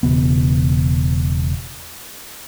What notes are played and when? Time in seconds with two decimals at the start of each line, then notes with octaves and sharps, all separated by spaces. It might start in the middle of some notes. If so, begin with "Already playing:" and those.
0.03 E1 D#2 C#3 B3